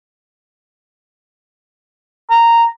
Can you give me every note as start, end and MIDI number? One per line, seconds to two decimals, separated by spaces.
2.31 2.66 82